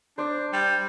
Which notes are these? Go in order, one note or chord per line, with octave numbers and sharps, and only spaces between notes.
D4 C5 D5
G3